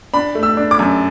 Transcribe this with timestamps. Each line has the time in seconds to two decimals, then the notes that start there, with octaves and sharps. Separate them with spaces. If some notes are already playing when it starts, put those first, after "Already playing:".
0.14 D4 B5
0.35 A3
0.43 E6
0.57 D4
0.71 D6
0.79 F#2